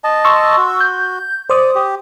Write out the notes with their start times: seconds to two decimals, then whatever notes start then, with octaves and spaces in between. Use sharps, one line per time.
0.04 D#5 A5
0.24 C6 C#6 E6
0.57 F#4
0.80 G6
1.50 C5 D5 D#6
1.75 G4